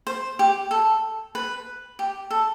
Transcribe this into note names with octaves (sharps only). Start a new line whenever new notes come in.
C5
G4
A4
B4
G4
A4